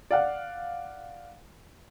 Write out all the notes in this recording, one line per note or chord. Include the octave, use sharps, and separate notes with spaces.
D5 F5 F#5